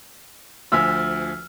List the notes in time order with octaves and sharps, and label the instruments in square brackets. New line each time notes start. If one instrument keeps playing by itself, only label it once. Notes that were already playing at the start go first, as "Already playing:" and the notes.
[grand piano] D2 F3 G#5 [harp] E6 F6 B6